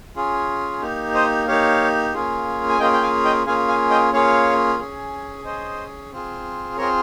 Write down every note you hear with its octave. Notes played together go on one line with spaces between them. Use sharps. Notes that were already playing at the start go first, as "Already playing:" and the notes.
C#4 F4 G#4
A#3 D#4 G4
C5 D#5
A#3 D#4 G4 C#5 F5
A#3 C#4 F4 G#4
G#5
A#3 C#4 F4 G#4 D#5 G5
G5
F5 G#5
D#5 G5
A#3 C#4 F4 G#4 F5 G#5
F5 G#5
D#5 G5
A#3 C#4 F4 G#4 C#5 F5
C#4 G#4
C#4 G#4 C5 D#5
C4 F4 G#4
C4 F4 G#4 A#4 C#5